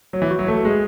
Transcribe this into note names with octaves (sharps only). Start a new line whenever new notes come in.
F#3 C#5
E3
F#4
F#3
A3 B4
G#3 G#4